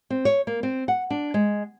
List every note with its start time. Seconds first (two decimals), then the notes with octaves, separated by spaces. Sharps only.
0.10 C4
0.25 C#5
0.47 A#3
0.63 C4
0.88 F#5
1.10 D4
1.34 G#3